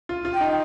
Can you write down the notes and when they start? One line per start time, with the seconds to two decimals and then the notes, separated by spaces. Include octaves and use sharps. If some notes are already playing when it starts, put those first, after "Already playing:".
0.09 F4
0.25 F4
0.33 G5
0.41 D#4